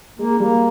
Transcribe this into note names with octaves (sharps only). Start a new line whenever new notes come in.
G#3 A#3
G3 A#3